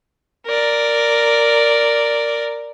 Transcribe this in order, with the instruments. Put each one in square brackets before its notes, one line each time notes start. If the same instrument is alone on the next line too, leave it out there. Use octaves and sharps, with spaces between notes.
[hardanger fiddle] A#4 D5